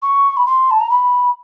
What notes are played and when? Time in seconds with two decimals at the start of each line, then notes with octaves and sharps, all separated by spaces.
0.02 C#6
0.37 B5
0.46 C6
0.71 A5
0.81 A#5
0.90 B5